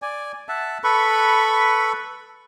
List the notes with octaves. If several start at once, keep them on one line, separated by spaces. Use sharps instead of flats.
D5 G#5
E5 F#5 A5
A4 B4 B5 C#6